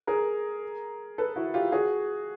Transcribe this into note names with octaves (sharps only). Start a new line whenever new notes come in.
G#4 A#4
A4 B4
E4 F#4
F4 G4
F#4 G#4